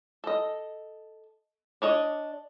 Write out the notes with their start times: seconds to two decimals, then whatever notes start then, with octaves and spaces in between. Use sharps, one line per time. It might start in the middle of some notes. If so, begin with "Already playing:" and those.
0.24 A4 D#5
1.82 D4 C#5 D#5